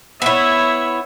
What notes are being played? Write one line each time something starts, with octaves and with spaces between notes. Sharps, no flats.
B3 E4 C#5 E5